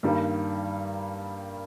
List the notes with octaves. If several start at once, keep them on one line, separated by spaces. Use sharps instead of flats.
G2 D#3 G3 A#3